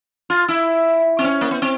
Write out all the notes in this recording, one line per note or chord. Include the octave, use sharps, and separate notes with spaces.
F4
E4
C4
C#4
A#3
B3
C4